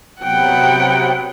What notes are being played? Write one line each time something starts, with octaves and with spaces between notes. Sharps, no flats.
C3 F#3 B3 F#5 G5